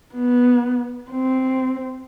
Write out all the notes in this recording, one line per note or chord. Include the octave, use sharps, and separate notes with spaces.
B3
C4